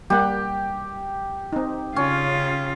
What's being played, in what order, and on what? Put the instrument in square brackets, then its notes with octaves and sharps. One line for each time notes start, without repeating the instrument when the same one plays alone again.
[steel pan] G3 A#3 F#5 [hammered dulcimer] G4
[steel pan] C4 D#4
[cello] C#3 F4 [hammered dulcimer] C#4